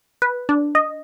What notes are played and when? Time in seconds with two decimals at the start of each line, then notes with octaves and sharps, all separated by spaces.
0.22 B4
0.49 D4
0.75 D#5